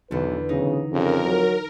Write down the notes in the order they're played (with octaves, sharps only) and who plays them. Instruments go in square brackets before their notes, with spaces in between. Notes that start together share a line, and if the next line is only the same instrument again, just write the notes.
[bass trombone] B1 [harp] E2 D3 [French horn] B4
[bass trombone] B1 [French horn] C#3 [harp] D#4
[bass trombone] F2 [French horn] C#3 [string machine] A#4
[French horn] F#3